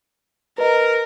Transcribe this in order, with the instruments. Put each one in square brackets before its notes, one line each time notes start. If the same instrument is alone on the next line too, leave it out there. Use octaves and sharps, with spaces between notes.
[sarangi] A#4 [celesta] B4 D#5